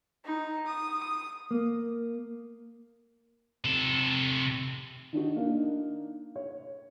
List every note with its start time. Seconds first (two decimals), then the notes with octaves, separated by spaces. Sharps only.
0.25 D#4
0.66 D#6
1.51 A#3
3.64 C3 A4
5.13 D#3 D4 D#4 F#4
5.36 A#3 D4 D#4
6.36 C#5